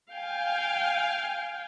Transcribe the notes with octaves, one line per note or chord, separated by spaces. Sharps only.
F5 G5 G#5